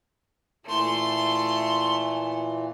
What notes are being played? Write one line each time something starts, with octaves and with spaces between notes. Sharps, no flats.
A#2 E3 A3 C6